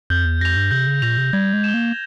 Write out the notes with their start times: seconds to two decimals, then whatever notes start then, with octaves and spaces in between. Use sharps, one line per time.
0.10 F2 G6
0.25 E2
0.41 F2 A#6 F7
0.56 G2
0.71 C3 G6
0.87 C#3
1.02 A#2 A#6 F7
1.17 C3
1.33 G3 G#6
1.53 G#3
1.64 E7 G7
1.74 A#3